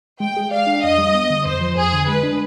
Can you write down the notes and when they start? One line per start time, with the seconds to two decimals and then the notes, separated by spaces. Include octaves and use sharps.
0.20 G#3 G5
0.37 G#4
0.51 D5 F5
0.67 D4
0.83 F2 D#5
0.98 G3
1.15 B3
1.30 D3
1.45 F2 C5
1.61 F3
1.77 F2 G#4
1.93 D3
2.08 G#3 B4
2.23 D4